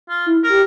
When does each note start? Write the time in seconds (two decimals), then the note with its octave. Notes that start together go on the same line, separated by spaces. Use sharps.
0.09 F4
0.26 E4
0.44 A#4
0.50 G4